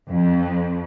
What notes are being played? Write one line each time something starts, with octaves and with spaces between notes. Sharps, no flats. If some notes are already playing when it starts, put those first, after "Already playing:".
F2